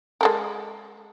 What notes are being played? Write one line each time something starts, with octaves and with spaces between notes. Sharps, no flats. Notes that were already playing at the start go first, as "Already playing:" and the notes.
G#3 A4 A#4